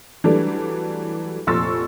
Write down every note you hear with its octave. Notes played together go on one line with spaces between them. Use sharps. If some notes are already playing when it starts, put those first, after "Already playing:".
E3 F#3 G3 A3 D4 A4
F1 A#2 C6 C#6 E6 A6